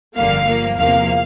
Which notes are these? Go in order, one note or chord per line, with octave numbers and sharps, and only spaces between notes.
G1 F2 D3 G3 A#3 F5
G2 F3 A#3
E2 C3 F3 A#3 F5